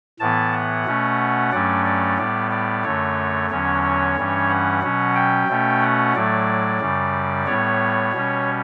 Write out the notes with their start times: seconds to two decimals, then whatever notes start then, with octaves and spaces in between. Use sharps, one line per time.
0.20 A2 E3 B3 A5
0.53 F#5
0.86 B2 A3 C#4
1.52 G2 F#3 A3 C#4 D5
1.85 D5
2.18 A2 G3 B3 D5
2.51 D5
2.84 F#2 D3 A3 C#5
3.50 E2 D3 F#3 C#4 C#5
3.83 C#5
4.17 G2 E3 G3 C#4
4.49 F#5
4.82 B2 F#3 C#4
5.15 G5
5.48 B2 A3 C#4
5.81 F#5
6.14 A2 F#3 A3 D5
6.81 F#2 C#3 G3
7.46 A2 G3 B3 C#5
8.13 B2 G3 C#4